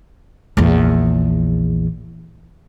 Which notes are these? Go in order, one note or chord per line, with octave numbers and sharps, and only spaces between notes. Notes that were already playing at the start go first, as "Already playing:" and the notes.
A#1 E2